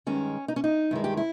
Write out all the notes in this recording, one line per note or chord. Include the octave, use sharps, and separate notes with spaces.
G2 D#3 G#3 C#4
D#4
C#4
D#4
G2 D#3 G#3 E4
G4
E4